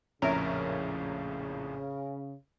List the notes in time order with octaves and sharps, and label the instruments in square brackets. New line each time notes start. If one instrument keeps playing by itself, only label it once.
[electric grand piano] A#1 F2 A2 [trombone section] C#3 [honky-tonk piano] C#4 E5 [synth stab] A#4